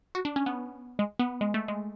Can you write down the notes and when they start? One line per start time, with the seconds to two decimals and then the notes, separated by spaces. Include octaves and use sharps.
0.15 F#4
0.25 D4
0.36 C#4
0.46 B3
0.99 G#3
1.19 B3
1.41 G#3
1.54 A3
1.68 G#3